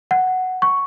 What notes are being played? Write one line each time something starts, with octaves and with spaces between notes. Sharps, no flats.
F#5
C#6